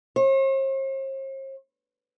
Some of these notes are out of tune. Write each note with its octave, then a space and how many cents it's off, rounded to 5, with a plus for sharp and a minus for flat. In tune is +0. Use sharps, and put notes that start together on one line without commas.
C5 +45